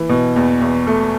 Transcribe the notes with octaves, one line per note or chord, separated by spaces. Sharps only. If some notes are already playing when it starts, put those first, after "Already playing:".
Already playing: E3
B2
E2
E2
A3